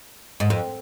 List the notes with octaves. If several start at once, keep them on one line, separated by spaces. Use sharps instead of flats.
G#2
F2